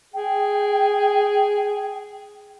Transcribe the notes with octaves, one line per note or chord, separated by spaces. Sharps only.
G#4 G5